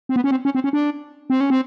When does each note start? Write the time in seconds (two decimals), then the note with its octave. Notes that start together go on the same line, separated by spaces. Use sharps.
0.09 C4
0.16 B3
0.24 C#4
0.31 C4
0.45 C#4
0.55 C4
0.64 C#4
0.73 D4
1.30 C4
1.40 C#4
1.50 C4